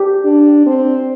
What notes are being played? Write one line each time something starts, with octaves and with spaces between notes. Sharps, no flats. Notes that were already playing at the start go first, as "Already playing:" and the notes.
Already playing: G4
D4
C4